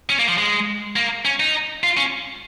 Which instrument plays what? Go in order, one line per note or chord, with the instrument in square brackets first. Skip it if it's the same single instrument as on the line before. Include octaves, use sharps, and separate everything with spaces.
[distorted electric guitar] C#4
A#3
F3
G#3
A#3
C#4
D#4
F4
C#4